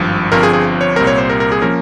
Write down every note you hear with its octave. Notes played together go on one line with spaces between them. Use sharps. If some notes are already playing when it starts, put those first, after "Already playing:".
Already playing: G#1 G2 F3
G1 G2 F3 C4 A#4
G#4
G#4
C#5
C2 A#2 G3 C4 A#4
C#5
C5
A#4
A#4
G#4
F3 A#3 C#4 A#4